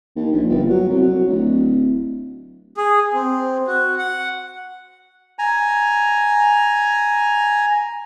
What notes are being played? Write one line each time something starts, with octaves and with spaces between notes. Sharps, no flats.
D#2
A#1
G1
F#3
C2
F#3
D1
G#4
C4
F#4
F#5
G#5 A#5